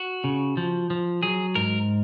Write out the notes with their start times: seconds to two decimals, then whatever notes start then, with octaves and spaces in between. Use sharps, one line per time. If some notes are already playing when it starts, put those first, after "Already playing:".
Already playing: F#4
0.24 C#3
0.57 F3
0.90 F3
1.23 F#3 G#4
1.55 G#2 A#4